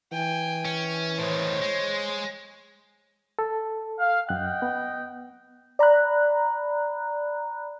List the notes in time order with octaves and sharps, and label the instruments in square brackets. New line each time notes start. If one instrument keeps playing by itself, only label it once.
[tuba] E3 [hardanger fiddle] G5 G#5
[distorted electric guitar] C#4
[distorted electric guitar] A2 D#3 [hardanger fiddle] C5 C#5
[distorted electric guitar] G#3
[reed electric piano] A4
[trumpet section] F5
[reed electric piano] F#2 F#6 [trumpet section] D#5 F#5 G5
[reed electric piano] B3
[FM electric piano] D5 A#5 B5 F#6